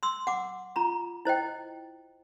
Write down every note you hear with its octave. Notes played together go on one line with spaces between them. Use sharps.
C6 E6
F#5 D6
F4 A#5 B5
E4 C5 D#5 G5